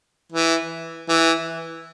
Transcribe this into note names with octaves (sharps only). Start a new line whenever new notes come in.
E3
E3